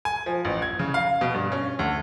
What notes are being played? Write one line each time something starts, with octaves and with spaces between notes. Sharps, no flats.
G#5
F3
A1
G#6
C#3
F5
B2
G2
C#4
D2